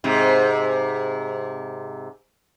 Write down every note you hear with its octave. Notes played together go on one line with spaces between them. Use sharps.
G#2 C3